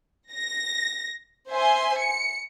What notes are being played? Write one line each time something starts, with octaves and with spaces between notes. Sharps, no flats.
A#6
C5 E5 G#5 C6
C#7